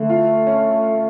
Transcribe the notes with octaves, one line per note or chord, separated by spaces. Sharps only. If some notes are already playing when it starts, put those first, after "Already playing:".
Already playing: D3 A3
F4
C#4